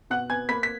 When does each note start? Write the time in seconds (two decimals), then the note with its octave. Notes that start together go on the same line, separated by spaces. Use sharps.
0.10 B2 F#5 F#6
0.30 B3 G#5 G#6
0.49 A#3 B5 B6
0.63 B6